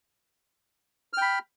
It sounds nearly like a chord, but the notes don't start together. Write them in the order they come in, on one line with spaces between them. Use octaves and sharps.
F6 G5 B5